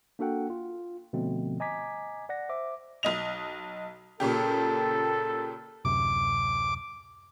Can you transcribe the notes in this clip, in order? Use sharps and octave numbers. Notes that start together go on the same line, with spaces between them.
A#3 D4 F#4 A4 F#5 G5
F4
B2 D3 F3 A3 C4
D#5 G#5 A#5 D6 G#6 B6
D5 F#5 A#6
C5 E5 D6
B1 D#5 F7
A#2 C#3 G4 A4
D1 F#2 C3 D6